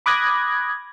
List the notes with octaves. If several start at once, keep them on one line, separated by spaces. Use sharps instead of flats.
B5 D6 D#6 F#6 G#6 A#6